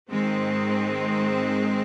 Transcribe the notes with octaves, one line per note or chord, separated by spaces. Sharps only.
G#2 D#3 G#3 C4